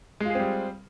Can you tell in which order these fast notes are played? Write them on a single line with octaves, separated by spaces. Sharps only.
G#3 F4 G#4 C4 G3